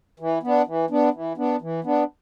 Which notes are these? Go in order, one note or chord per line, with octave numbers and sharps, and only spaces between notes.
E3
B3 D4
E3
B3 D4
E3
B3 D4
E3
B3 D4